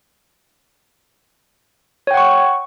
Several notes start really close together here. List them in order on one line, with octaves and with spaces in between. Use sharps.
C#5 G5 F#5 C#6